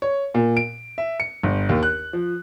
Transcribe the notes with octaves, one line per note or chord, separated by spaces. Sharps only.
C#5
A#2
D7
E5
C#7
G1
D#2
F#6
F3